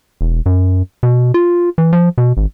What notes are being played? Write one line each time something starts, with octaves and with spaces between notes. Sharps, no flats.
E1
F#2
B2
F4
E3
F3
B2
G#1